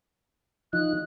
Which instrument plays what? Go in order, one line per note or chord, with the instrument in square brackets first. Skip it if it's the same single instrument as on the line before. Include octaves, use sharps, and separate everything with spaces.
[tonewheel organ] F3 D#4 [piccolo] F#6